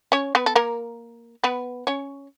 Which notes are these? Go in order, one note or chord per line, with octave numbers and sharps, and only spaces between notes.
C#4 C#5
B3 B4
A4
A#3 A#4
B3 B4
C#4 C#5